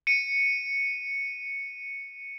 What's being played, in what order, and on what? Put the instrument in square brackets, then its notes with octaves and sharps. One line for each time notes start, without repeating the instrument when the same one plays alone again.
[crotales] C#7 D#7